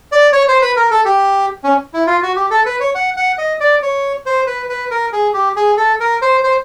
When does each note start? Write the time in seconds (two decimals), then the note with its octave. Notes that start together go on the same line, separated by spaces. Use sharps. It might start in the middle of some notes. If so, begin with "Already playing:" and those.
0.12 D5
0.33 C#5
0.48 C5
0.62 B4
0.77 A#4
0.91 A4
1.05 G4
1.64 C#4
1.94 E4
2.07 F4
2.22 F#4
2.36 G4
2.50 A4
2.66 B4
2.80 C#5
2.95 F#5
3.17 F#5
3.38 D#5
3.60 D5
3.82 C#5
4.26 C5
4.47 B4
4.69 B4
4.91 A#4
5.12 G#4
5.34 G4
5.56 G#4
5.77 A4
6.00 A#4
6.22 C5
6.44 C5